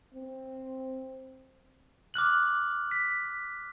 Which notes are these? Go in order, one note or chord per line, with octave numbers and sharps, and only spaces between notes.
C4
D6 F6 F#6 F#7
B6